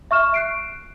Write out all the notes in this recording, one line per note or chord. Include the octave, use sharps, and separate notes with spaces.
E5 C#6 F6 E7
F#6 C7 D7